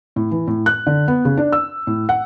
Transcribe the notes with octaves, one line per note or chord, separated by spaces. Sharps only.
A2
E3
A2
F#6
D3
B3
C#3
D4
E6
A2
F#5